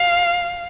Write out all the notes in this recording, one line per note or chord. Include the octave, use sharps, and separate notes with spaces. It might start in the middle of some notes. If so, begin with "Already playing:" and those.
Already playing: F5